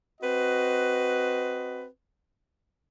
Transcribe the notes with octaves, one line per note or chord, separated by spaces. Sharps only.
C4 F#4 B4 D#5